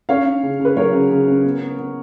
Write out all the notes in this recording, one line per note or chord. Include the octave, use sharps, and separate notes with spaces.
C#4 C#5 F5
C#4
C#3
C#3
B4
F#3 A#4 C#5
C#3
C#3
C#4
B3
B3
B3